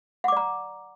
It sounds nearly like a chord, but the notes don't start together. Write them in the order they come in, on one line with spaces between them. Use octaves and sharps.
F#5 D6 D5 A#5